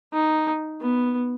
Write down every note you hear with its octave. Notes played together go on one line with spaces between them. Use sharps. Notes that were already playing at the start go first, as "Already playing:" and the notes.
D#4
B3